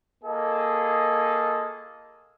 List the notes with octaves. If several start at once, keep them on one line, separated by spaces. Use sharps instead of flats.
A#3 F4 G#4 A4 D#5